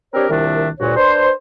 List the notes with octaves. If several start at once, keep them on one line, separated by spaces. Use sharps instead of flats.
C4 D4 G4 A#4 C#5
C2 A#2 D#3 D4 E5
D2 G2 A#2 F#4 C#5
D4 B4 C5